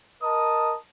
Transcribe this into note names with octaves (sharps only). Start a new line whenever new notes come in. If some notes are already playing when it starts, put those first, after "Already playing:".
A#4 D#5 A5 D#6